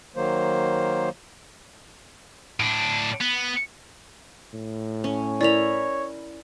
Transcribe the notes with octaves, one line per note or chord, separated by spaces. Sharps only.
D#3 F#3 A#3 C5
A2 D4
B3
A2
C#4
E4 A#4 C#5 D5 B5 F7